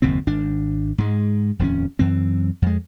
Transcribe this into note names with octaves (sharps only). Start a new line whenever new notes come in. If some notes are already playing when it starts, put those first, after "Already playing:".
F#1 D#2 B2 C4
G#1 D4
G#2 G#3
D#1 F2 F#3 C#4
F#2 E3 C4
F2 G#3